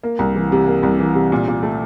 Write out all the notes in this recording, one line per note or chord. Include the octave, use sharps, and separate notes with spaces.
A#3
C2
E3
C3
A#3
C2
E3
C3
A#2
A#2
A3